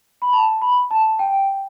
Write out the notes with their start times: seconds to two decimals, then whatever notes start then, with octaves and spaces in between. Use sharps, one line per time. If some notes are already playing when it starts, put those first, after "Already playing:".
0.22 B5
0.33 A5
0.62 B5
0.91 A5
1.19 G5